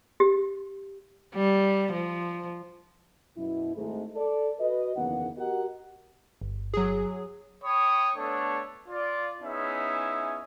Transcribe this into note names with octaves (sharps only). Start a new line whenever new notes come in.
G4
G3
F3
F#2 B2 E4
G#1 G#2 G#3 A3
A4 D5
F#4 B4 D#5
F#1 E2 D#3 A#3 B3 F#5
F#4 G4 A#4 D#5 F#5
G1
F#3 G#4
C#5 G5 B5 C#6 D#6
A3 B3 D4 A4 C#5
F4 D5
B3 C#4 D#4 E4 G#4 E5